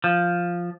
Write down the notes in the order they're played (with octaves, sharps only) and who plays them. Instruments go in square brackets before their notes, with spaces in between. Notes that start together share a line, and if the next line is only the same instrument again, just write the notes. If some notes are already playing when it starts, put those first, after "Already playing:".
[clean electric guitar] F3